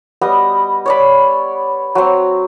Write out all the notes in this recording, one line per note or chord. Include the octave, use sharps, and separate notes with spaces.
G3 B3 D#5 D#6
C#5 D5 B5
F#3 C4